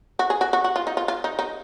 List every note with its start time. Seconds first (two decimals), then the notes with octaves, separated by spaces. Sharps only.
0.19 F#4
0.30 G#4
0.41 F#4
0.53 F#4
0.64 F#4
0.76 F4
0.87 D#4
0.97 F4
1.08 F4
1.24 D#4
1.39 D#4